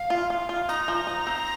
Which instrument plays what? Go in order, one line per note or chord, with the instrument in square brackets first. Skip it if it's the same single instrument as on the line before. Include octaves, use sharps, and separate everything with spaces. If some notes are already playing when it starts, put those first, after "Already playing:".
Already playing: [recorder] F5
[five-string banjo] F4
F4
F4
[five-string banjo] D#4 [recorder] A#5
[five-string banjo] F3
D#4
C4